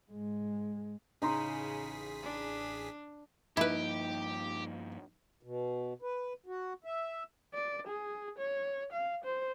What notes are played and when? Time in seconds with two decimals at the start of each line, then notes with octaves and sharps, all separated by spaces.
0.11 G#2 G#3
1.22 A1 C#3 D#4 G#4 A#5 C6 B6
2.23 D4
3.57 G2 F3 A#3 D#4 E4 G4 B4 G5
5.43 B2
6.02 B4
6.46 F#4
6.84 E5
7.54 D5
7.87 G#4
8.39 C#5
8.93 F5
9.24 C5